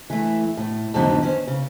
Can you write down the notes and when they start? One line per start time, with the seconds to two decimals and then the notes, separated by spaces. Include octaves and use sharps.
0.10 E3 A3
0.57 A2
0.94 F2 A2 D3 D#3 F#3 B3
1.23 C#4 C5
1.47 C#3